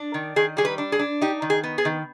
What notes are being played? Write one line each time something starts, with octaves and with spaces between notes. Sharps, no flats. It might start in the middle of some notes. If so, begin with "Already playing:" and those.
Already playing: D4
D#3
D#3 G#4
G3 G#4
B4
D4
G#4
D4
D#4 G4
D#3
G#4
B3
G#4
D#3